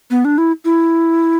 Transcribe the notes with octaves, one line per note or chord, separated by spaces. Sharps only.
B3
D4
E4
E4